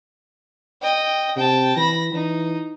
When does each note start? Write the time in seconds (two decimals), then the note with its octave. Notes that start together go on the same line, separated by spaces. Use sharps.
0.82 D#5 G5
1.36 C3 G5 A5
1.76 E3 B5 A#6
2.14 E3 D#4